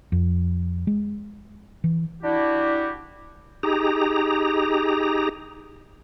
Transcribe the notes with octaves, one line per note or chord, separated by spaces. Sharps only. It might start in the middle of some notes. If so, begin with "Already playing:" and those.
F2
G#3
E3
D4 E4 F#4 G4
D#4 G4 G#4 A#5